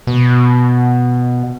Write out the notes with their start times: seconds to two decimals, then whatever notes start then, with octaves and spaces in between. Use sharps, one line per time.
0.07 B2